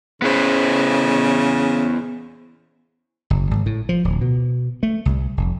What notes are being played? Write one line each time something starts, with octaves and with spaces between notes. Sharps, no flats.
C#3 B3 E4 C5
F#1
G#1
A2
F3
D1
B2
A3
C2
F1